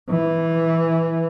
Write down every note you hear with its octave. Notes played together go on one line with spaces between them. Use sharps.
E3